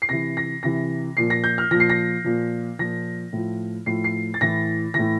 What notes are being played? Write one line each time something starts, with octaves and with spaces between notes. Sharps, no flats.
C7
C3 E3 A#6
A#6
C3 E3 A#6
A#2 F3 C7
A#6
G6
F6
A#2 F3 A#6
C7
A#6
A#2 F3
A#2 F3 A#6
A2 F3
A2 F3 C7
C7
A6
A2 E3 A#6
A2 E3 A#6